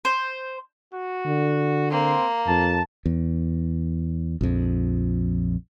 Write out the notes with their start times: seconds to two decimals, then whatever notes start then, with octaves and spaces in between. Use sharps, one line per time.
0.05 C5
0.92 F#4
1.26 D3
1.90 A#3 C4 C6
2.46 F2 A5
3.06 E2
4.41 A#1 F2